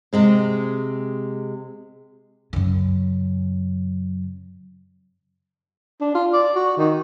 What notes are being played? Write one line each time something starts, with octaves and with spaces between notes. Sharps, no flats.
C3 G#3 C4
F#2 C#3
D4
F4
D5
F#4
D#3